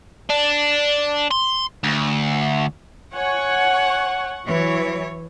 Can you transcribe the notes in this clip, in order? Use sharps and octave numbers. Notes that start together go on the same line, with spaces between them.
D4
C6
D2
C#5 F#5 G#5 C#6
E3 F#3 C#5